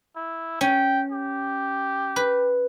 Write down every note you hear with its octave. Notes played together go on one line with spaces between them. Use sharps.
E4
C#4 G5
G4
B4